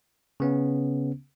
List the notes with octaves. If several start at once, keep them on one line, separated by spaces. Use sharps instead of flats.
C#3 B3 C#4